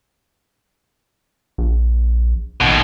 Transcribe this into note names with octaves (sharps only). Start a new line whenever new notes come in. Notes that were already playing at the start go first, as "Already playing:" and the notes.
A#1
A1 D#2 B2